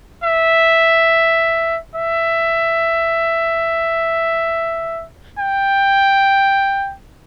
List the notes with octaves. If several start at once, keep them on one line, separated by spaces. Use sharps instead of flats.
E5
E5
G5